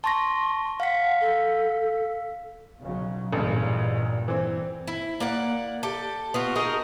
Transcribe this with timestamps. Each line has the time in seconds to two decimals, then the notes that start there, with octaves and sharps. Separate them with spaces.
0.04 A5 C6 C#6 A#6
0.80 F5 F#5 B6
1.21 A4
2.82 B1 C#3 F#3
3.33 A1 G2 A#2 C#3
4.28 E3 C4
4.88 E4
5.20 A#3 D5 F#5
5.83 G4 A4
6.34 B3 F4 F#4
6.56 D#4 F#4 G#4 A#4